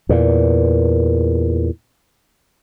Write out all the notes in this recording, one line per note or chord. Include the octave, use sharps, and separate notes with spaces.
E2 A#2